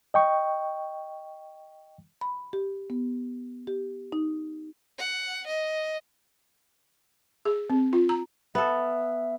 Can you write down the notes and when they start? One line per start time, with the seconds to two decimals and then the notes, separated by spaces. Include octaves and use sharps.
0.14 D#5 G5 C#6
2.21 B5
2.53 G4
2.90 B3
3.67 G4
4.12 D#4
4.98 F#5
5.47 D#5
7.45 G#4
7.70 C4
7.93 F4
8.09 A#5
8.55 B3 A4 E5